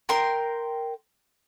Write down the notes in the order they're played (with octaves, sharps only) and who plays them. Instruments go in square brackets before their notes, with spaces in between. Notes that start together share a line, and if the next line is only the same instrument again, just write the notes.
[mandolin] A#4 G5 C6